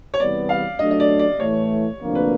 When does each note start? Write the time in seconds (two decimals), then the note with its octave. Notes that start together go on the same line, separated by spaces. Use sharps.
0.14 C#5
0.19 E2 C3 E3 G3 B3 D5
0.49 F5
0.79 F#3 A3 D4 D#5
0.91 D#5
1.00 D5
1.19 D5
1.40 A2 E3 A3 C#5
2.00 D2 C3 F3 A#3 D4
2.15 B4